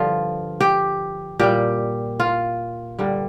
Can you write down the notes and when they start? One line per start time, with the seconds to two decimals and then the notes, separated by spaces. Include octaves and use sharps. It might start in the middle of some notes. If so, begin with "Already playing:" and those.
Already playing: G2 D3 F3 F4
0.61 G4
1.39 A#2 G3 G4
2.20 F4
2.99 G2 D3 G3